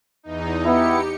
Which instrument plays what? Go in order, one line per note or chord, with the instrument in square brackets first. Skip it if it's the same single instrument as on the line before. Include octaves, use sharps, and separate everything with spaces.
[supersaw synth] E2 D#4
[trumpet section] B3 E4 [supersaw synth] G4 C#7